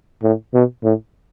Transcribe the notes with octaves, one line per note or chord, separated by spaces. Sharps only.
A2
B2
A2